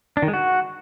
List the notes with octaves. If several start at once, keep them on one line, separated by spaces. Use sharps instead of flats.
D4
D#3
G#3
F#4